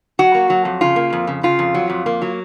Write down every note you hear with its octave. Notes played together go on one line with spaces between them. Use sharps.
F#3 F#4
A#3
F#3
F2
C#3 F4
A#3
F2
C#3
C#3 F4
F2
F#3
F2
A#3
F#3